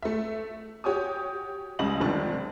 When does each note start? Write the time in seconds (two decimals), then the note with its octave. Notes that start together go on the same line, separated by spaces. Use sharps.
0.02 A3 E5
0.84 F#4 G4 C#5 G#5 D#6
1.79 C#2 C#3 G3 D#5 F#7
2.00 F1 F2 D3 D#3 G3 D4